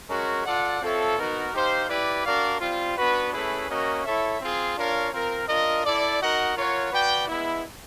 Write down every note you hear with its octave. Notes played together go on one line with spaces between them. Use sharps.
G#3 C#4 F#4 A#4
F4 A4 D5 F#5
C4 F4 A4 C#5 E5
B3 D#4 F#4 A#4
D#4 G4 C5 F5
E4 G4 B4 D5
D4 F#4 A#4 D5 F5
G3 C4 F4
B3 D4 F#4 B4
A3 C#4 E4 G#4 B4
A#3 C#4 F#4 A#4 D#5
E4 A4 C#5 E5
C4 F4 G#4
D4 F4 A#4 C#5 F5
C4 F4 A#4
D4 F4 A#4 D#5
E4 A4 D5
D#4 F#4 A#4 D#5 F#5
F4 A#4 C#5 F#5
F#4 B4 D5 G5
G#3 B3 E4